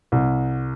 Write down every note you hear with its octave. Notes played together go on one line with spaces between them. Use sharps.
C2